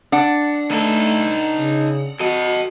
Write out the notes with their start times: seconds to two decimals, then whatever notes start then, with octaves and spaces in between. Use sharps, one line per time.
0.12 D4 F#5
0.71 A3 D#4 A4
1.57 C#3
2.20 F#4 A4 D#5